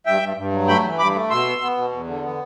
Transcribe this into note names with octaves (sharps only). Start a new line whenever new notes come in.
G2 E5 G5
G2
G2
F#3
A3 G5 B5
E3
G2 B5 D6
A3
B2 C6 E6
B3
B3
B2
E2
D3
B3